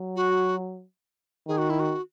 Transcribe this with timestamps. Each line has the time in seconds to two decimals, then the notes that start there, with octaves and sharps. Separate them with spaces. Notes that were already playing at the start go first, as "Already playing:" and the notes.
Already playing: F#3
0.16 F#4
1.47 D#3 G#4
1.58 F#4
1.70 E4
1.79 F#4